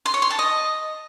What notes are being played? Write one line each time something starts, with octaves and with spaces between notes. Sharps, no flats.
C6
C#5
C6
A5
D#5